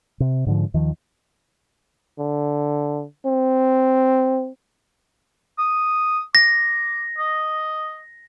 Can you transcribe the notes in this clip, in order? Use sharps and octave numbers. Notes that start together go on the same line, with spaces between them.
C3
G#2 D3 F3
D#2 D#3 F3
D3
C4
D#6
D6 A#6
D#5